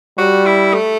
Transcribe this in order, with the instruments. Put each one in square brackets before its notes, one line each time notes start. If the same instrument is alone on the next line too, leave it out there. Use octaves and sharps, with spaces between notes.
[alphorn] G3 [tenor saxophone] F#4
[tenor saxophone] E4
A3